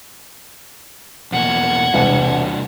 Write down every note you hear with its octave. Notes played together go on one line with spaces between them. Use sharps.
E2 B2 A#3 F#5 G#6
E1 C2 C3 G3 D4